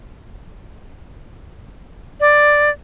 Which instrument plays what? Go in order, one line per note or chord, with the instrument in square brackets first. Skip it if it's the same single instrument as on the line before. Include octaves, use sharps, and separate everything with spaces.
[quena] D5